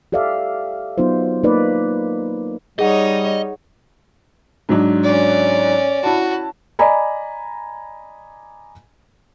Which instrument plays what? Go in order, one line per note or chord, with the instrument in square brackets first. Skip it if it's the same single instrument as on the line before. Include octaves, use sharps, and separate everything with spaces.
[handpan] G4 A4 D5 E5 F5
F#3 B3 D#4 F4 C5
A#3 D#4 B4 D5
[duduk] G3 [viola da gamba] D#4 C#5 [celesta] G#4 F#5 [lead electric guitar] D#5
[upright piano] G#2 F#3 D4
[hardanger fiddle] C#4 D5
[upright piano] E4 A5 [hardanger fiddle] F#4
[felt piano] D5 D#5 G#5 A#5 B5